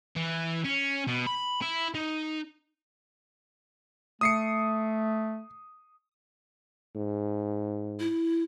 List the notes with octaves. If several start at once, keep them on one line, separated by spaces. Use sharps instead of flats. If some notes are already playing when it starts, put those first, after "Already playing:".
E3
C#4
B2
B5
E4
D#4
A3 D#6 C7 C#7
G#2
E4